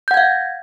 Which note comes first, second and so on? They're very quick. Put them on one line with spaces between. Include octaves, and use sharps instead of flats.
G6 F#5 G#6 F5